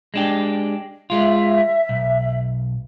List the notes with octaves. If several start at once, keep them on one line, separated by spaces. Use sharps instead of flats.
G#3 D4 G4
G#3 F4 E5
B1